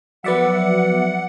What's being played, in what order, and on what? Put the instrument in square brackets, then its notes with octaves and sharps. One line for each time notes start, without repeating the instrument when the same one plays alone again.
[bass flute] F3 [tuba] F#3 [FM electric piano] B3 D5 E5 [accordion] F#5